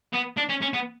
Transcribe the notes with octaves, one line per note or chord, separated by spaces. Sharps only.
B3
D4
C#4
C#4
B3